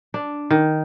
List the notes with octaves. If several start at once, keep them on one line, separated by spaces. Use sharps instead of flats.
D4
D#3